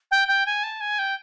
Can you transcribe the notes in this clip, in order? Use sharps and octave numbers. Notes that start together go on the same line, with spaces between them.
G5
G5
G#5
A5
G#5
G5